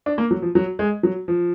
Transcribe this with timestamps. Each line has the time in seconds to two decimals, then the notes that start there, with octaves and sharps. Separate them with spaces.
0.06 D4
0.18 A#3
0.31 F#3
0.42 F3
0.55 F#3
0.79 G#3
1.03 F#3
1.28 F3